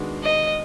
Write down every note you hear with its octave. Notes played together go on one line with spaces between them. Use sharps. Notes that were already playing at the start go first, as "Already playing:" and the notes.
Already playing: D#3 G#3 B3 D4 F#4
D#5